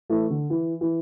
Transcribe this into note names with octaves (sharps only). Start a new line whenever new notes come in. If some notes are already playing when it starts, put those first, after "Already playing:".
E3 A3
D3
E3
E3